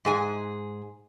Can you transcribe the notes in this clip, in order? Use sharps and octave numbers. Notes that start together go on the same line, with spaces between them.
G#2 G#4 G#5